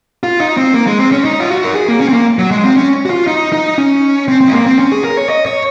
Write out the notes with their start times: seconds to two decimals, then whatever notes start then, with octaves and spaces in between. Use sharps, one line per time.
0.23 F4
0.40 D#4
0.57 C4
0.74 A#3
0.87 G#3
0.99 C4
1.12 C#4
1.25 D#4
1.40 F4
1.50 F#4
1.64 A#4
1.75 G#4
1.88 A#3
2.01 C#4
2.08 C4
2.14 A#3
2.39 F#3
2.51 G#3
2.64 C4
2.76 C#4
3.06 F#4
3.10 F4
3.27 D#4
3.52 D#4
3.78 C#4
4.28 C4
4.41 C4
4.48 G#3
4.54 A#3
4.66 C4
4.79 C#4
4.92 G#4
5.04 A#4
5.17 C#5
5.29 D#5
5.46 C#5